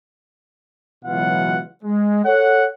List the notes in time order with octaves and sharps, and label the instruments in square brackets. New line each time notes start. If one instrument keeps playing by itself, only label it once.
[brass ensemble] C#2 B2 E3 F#3 F4 F#5
G#3
A4 C#5 F#5